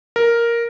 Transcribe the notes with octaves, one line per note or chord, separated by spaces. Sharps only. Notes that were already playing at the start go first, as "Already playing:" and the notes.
A#4